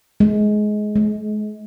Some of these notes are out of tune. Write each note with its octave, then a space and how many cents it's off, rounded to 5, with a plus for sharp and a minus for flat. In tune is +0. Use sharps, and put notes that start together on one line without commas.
G#3 +20
G#3 +40